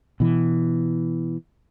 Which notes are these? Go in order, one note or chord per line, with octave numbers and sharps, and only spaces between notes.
B2 E3